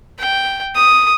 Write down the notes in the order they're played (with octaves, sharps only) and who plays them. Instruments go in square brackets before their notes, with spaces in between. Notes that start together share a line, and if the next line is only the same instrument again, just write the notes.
[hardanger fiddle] G5
D#6